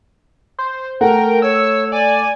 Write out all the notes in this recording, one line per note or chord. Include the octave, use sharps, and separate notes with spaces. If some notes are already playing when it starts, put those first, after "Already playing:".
C5
A3 A#4 F#5 G5
C#5 E6
D5 G#5